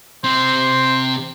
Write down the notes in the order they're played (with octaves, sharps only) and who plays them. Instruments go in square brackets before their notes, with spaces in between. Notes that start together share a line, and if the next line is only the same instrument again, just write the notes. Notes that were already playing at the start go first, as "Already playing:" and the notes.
[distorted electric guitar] C3 C4 [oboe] C5